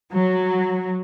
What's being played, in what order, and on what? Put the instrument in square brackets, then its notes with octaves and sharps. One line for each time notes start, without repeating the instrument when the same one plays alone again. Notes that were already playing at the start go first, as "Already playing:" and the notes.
[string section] F#3